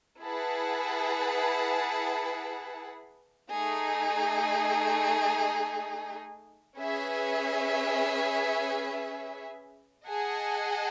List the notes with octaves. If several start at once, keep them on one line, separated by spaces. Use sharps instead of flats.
E4 G#4 B4 F#5 A5
A3 D#4 G#4
C#4 G#4 B4 E5
G#4 D#5 F#5 A5